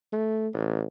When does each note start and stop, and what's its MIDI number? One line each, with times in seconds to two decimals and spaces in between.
0.13 0.48 57
0.53 0.85 33